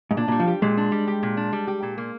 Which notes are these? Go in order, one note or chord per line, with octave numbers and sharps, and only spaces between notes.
G#2
A#2 D4
A#2 G3
F3
G4
A#2 G#3
D4
G3
G4
A#2
D4
G3
G4
A#2
A#3